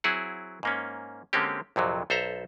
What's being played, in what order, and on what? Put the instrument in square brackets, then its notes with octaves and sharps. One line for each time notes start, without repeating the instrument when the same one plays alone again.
[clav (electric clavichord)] F#3 C4 E4 G#4 F#5
G#2 A#3 C#4
D3 G#3 A#3 C4 C#4 G4
A#1 F2 C3 F#3
B1 A4 C5 E5 A#5